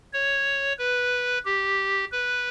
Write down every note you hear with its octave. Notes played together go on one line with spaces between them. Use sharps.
C#5
B4
G4
B4